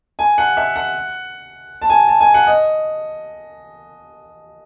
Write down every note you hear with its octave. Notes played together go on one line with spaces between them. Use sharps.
G#5
F#5
E5
F#5
A5
G#5
A5
G#5
F#5
D#5